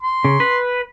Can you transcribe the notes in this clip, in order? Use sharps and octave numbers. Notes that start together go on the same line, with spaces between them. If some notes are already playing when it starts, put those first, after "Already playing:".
C6
C#3
B4